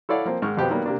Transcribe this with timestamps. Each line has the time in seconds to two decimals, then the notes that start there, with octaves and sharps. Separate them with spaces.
0.09 E4 A4 C#5 D5 F5 F#5
0.25 F3 A#3 C4
0.42 G#2 D#3 C#6 F6
0.57 F2 B2 G4 B4 C5
0.70 D#3 F#3 G3 A#3 B3
0.86 C3 A#3 D4